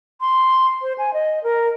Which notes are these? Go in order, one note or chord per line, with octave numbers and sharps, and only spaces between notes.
C6
C5
G#5
D#5
A#4